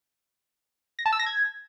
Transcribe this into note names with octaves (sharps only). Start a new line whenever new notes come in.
A#6
A5
E6
A#6
G#6